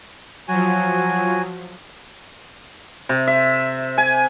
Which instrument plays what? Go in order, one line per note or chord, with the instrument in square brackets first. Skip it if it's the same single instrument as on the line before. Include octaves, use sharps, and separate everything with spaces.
[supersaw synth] F3 F#3 [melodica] F#4 G#5
[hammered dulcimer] C3
E5
G#5